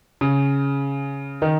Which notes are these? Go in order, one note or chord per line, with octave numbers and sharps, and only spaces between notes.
C#3
D#3